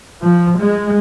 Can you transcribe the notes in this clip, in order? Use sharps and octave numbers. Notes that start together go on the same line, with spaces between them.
F3
G#3